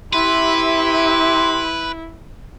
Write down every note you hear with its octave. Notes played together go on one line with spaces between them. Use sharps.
E4 G4 B4 E5 C6